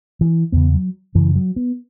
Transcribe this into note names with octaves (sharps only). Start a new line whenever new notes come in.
E3
E2 C#3 B3
F#3
F#2 C#3 E3
F#3
B3